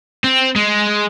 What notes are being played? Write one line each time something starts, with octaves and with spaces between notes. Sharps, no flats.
C4
G#3